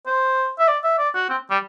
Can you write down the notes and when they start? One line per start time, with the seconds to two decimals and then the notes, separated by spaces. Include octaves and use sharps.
0.06 C5
0.59 E5
0.68 D5
0.84 E5
0.98 D5
1.15 F#4
1.29 C4
1.51 G3